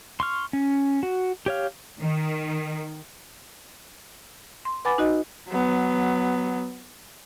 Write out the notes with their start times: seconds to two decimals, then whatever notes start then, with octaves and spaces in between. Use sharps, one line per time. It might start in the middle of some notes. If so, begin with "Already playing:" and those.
0.20 C6 C#6 F6
0.53 C#4
1.03 F#4
1.46 G4 C#5 F5
2.00 D#3
4.65 C6
4.85 B4 F#5 G#5 B5 D6 A6
4.98 D#4 F#4 D#5
5.49 F#3 B3